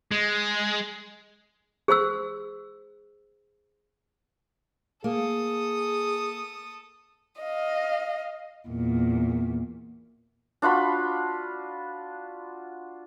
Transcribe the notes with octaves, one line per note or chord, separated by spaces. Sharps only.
G#3
G#4 C5 C6 E6
A#3 G#4 A4 D#6
D#5 F5
E2 A#2
D4 F4 F#4 B5